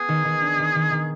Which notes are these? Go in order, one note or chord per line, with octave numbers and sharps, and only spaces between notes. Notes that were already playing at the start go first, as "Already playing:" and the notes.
Already playing: B3 G#4
D#3
D#3
D4
D#3
D#3
D#3